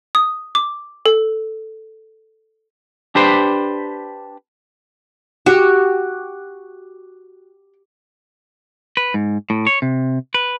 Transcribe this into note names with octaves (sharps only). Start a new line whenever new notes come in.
D#6
D6
A4
D4 G4 B4 C5
F#4 G4
B4
G#2
A2
C#5
C3
B4